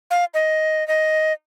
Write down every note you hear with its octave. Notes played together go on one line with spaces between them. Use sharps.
F5
D#5
D#5